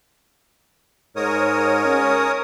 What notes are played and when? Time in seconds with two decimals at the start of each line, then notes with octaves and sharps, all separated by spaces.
1.16 G#2 A#4 C#5 D#6
1.85 C#4